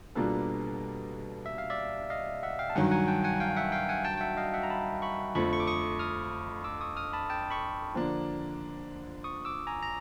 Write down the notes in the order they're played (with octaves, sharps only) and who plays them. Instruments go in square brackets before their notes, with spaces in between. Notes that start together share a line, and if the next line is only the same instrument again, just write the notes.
[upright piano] B2 G3 A#3 D4 F4 [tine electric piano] A4 B4
[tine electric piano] E5
F5
D5 E5
D#5 F5
E5 F#5
F5 G5
A5
[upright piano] G2 D#3 F#3 [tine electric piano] F#5 G#5
[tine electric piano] F#5 G#5
G5 A5
F#5 G#5
F5 G5
E5 F#5
F5 G5
F#5 G#5
G5 A5
G5
E5 F#5
D#5 F5
E5 F#5
A#5
A5 B5
B5 C#6
[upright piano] F2 D3 F3 A3 [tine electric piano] B5 C#6
[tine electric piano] C#6
D6
C#6 D#6
D#6 F6
D6 E6
C#6 D#6
D#6 F6
A5 B5
G5 A5
B5 C#6
[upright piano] D3 F3 A#3 D4
[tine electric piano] C#6 D#6
D6 E6
G#5 A#5
A#5